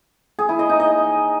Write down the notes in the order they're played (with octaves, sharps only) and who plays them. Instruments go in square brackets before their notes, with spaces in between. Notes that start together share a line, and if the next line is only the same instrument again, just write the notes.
[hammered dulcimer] G#4
E4
D#5
D#4
D#5